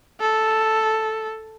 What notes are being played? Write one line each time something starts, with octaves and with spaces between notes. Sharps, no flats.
A4